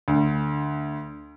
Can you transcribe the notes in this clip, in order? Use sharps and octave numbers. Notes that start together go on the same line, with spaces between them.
D2